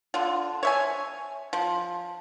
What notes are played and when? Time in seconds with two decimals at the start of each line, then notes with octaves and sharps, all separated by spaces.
0.14 D3 F4
0.63 C#5 E5 G#5
1.53 F3